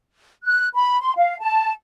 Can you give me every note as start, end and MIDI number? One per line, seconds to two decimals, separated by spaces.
0.44 0.67 90
0.74 0.99 83
1.00 1.12 84
1.16 1.36 77
1.40 1.72 81